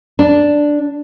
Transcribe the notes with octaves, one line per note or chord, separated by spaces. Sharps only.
D4